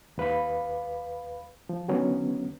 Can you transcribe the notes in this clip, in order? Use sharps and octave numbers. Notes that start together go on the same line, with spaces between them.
D#2 B4 F5 B5
F3
D3 D#3 F#3 B3 C#4